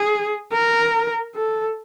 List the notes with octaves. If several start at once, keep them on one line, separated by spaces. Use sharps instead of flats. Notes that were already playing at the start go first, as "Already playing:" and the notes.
Already playing: G#4
A#4
A4